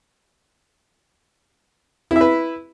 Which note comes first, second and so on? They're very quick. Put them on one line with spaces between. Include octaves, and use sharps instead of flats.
E4 E5 B4